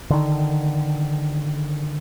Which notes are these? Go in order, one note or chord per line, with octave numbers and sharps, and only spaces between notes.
D3 D#3